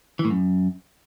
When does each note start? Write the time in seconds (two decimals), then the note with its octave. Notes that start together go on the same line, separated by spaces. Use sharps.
0.19 E3
0.25 A2
0.30 F#2